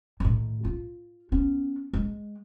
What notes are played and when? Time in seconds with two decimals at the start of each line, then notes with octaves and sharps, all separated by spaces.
0.20 A2 D#3
0.65 F4
1.32 B3 C#4
1.93 G#3